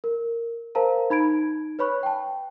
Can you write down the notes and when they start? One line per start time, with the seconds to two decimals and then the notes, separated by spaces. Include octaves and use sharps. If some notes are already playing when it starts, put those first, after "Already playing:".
0.04 A#4
0.75 A#4 C5 F5 A5 A#5
1.10 D#4 B5 G#6 D7
1.79 B4 C#5 B5 C#6 F#6
2.03 G5 A5